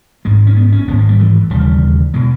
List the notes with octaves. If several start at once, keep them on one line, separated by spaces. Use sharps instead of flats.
G#1 G#2 G#3
C#4
B3
C#4
G#1 G#2 B3
A#3
G3
E3
E1 D#2 C#3 G3
B2 G#3